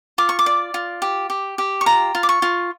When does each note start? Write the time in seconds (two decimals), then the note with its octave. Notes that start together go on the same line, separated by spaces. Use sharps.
0.18 F4 D6
0.29 C#6
0.39 D6
0.46 D5
0.74 F4
1.02 G4
1.30 G4
1.58 G4
1.81 C#6
1.86 F4 A#5
2.15 F4
2.23 D6
2.29 C#6
2.42 F4